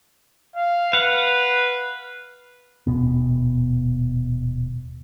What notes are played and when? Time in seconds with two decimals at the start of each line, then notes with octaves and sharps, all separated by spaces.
0.56 F5
0.93 B4 F5 F#5
2.87 D#1 F#2 B2 B3